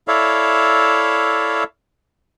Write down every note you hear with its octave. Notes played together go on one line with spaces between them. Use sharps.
E4 A4 C#5 D5 E5 F5